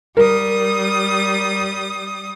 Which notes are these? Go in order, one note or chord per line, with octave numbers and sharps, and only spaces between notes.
G3 A#4 D#6